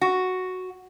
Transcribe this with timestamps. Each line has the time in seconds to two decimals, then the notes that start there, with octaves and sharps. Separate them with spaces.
0.01 F#4